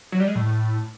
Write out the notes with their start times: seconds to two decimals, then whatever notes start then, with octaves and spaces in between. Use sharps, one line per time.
0.12 F#3
0.20 G3
0.28 G#3
0.35 A2